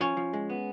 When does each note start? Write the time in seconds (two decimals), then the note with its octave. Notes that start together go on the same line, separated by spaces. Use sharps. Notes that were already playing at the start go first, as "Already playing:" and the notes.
0.01 F3 C#4
0.17 F3
0.33 G#3
0.50 B3